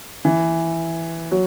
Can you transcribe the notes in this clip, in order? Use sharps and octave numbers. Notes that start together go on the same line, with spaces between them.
E3
F#3